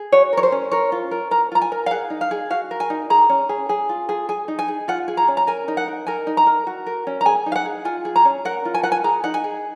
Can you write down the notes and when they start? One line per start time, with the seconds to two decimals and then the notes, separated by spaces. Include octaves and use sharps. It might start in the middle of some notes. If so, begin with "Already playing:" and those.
Already playing: G#4
0.12 F#4 C#5
0.33 A#4 C#5
0.43 C5
0.52 C#4
0.71 A#4 C#5
0.92 F4
1.11 A#4
1.31 A#4 A#5
1.52 F4 A#5
1.61 G#5
1.72 A#4
1.86 F5
1.91 G#4 F#5
2.10 D#4
2.21 F5
2.31 G#4
2.50 F#4 F5
2.71 A#4
2.80 G#5
2.90 D#4
3.10 G#4 A#5
3.29 C#4
3.49 G#4
3.69 G#4
3.89 F4
4.09 G#4
4.29 G#4 G#5
4.48 D#4
4.59 G#5
4.68 G#4
4.88 F4 F#5
5.08 G#4
5.17 A#5
5.28 C#4
5.37 A#5
5.47 A#4 G#5
5.68 D#4
5.77 F#5
5.88 A#4
6.07 A#4 G#5
6.27 D#4
6.37 A#5
6.47 A#4
6.67 F#4
6.86 A#4
7.07 C#4
7.21 A#5
7.26 G#4 G#5
7.46 D#4
7.52 F5
7.56 F#5
7.66 G#4
7.85 F4 G#5
8.05 G#4
8.16 A#5
8.25 C#4
8.45 A#4 F#5
8.65 F4
8.74 G#5
8.83 A#4 F#5
8.92 G#5
9.04 G#4 A#5
9.24 D#4 F#5
9.34 G#5
9.44 G#4